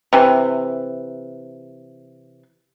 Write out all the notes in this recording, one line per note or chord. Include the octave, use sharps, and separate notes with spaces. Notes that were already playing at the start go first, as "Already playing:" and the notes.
C3 E3